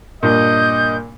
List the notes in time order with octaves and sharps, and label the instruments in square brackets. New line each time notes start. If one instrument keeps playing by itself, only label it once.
[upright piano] G2 A#2 [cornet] D#5 [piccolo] G6